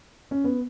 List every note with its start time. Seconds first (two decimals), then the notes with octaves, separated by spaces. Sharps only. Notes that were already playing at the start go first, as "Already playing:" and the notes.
0.31 C#4
0.44 B3